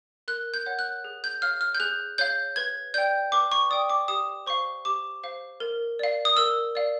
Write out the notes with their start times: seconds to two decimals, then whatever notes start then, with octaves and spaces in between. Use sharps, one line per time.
0.28 A#4 F#6
0.54 G6
0.66 C#5 F#5
0.79 F#6
1.04 G#4
1.24 G6
1.42 C#5 F5 F6
1.61 F6
1.75 G6
1.80 G#4 F#6
2.18 C#5 F5 G6
2.56 B4 G#6
2.94 D5 G5 G6
3.32 B4 D6
3.52 C#6
3.70 D5 G5 D#6
3.89 D6
4.08 G4 D#6
4.47 C5 F5 C#6
4.85 G4 D6
5.23 C5 F5
5.60 A#4
5.99 D5 F5
6.25 D#6
6.37 A#4 E6
6.75 D5 F5